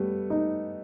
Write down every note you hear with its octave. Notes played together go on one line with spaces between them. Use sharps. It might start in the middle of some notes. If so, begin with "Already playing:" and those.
Already playing: G3 A3 B3
D#4